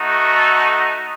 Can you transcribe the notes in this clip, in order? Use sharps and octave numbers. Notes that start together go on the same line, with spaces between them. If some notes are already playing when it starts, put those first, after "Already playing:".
Already playing: A3 D#4 F#4
A4